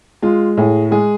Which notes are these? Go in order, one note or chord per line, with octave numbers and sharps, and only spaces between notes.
G#3 F4
A2 G#4
G#3 G#4